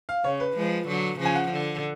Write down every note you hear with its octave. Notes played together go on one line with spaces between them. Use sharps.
F5
C#3 C#5
B4
F3 G#3
D3 F#3
C#3 F3
G#5
F#5
D3